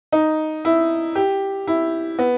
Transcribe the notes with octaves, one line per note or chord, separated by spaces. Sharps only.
D#4
E4
G4
E4
B3